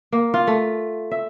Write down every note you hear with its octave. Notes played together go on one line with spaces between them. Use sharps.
A#3
F4
A3
E5